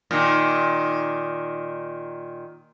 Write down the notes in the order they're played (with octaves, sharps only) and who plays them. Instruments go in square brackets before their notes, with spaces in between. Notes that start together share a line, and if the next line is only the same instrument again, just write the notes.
[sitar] A#2 D#3